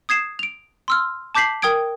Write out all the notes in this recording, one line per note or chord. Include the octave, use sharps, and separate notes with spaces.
D#6 G#6 C7 E7
D7 F7
C6 E6 F6
A5 D6 G6 B6 C7 F#7
A#4 G5 D#6 G#6 D7